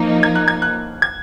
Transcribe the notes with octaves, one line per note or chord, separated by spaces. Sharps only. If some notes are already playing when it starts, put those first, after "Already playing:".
Already playing: F3 A#3 D#4
G#6
F#6
G#6
F#6
G#6